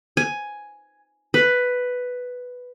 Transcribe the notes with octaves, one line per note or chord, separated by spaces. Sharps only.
G#5
B4